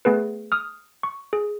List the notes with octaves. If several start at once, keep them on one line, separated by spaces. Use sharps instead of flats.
A3 B3 G#4 B4
D#6 F6
C#6
G#4